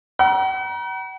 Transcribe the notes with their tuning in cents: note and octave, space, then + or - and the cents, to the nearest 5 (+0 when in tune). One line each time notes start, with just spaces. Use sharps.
F#5 +40 A#5 +35